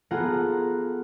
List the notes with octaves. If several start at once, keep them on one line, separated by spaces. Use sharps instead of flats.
B3 F4 G#4 A4 F#5 A#5